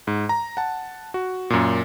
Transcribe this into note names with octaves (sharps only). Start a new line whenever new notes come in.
G#2
A#5
F#5 A5
F#4
F#2 A#2